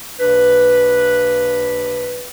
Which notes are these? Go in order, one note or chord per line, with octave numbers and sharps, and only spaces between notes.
D#2 C#3 D4 B4